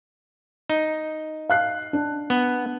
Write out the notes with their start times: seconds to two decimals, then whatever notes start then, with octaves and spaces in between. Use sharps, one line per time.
0.69 D#4
1.49 F5 F#6 C7
1.93 D4
2.30 B3